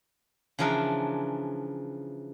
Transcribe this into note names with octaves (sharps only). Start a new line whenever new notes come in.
C#3 E3 F3 D4 A#4